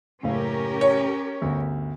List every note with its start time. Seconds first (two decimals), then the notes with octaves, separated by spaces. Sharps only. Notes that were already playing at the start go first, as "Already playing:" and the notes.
0.23 F#1 A2 C#4 G4 A#4 F5
0.81 C#5
1.42 G1 D2